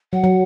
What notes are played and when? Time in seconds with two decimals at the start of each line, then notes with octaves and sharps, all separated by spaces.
0.13 F#3 F#5
0.24 F#3